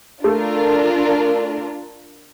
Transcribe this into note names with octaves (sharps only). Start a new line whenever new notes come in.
A3 D4 F4 A#4